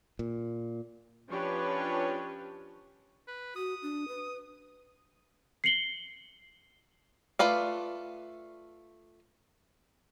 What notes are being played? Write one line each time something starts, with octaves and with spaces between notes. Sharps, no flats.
A#2
F3 C#4 D4 G4 B4 C#5
B4
F#4 D#6
D4
B4
C7 C#7 F#7 G7
A3 F4 B4 D5 F5